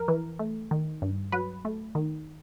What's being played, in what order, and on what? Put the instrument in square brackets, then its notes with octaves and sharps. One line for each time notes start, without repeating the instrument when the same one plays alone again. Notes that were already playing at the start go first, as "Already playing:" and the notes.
Already playing: [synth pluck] F2 A#4
E3
A3
D#3
G2
F#3 B4
A3
D#3